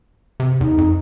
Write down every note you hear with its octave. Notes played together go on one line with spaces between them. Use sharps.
C3
E2 D#4
F2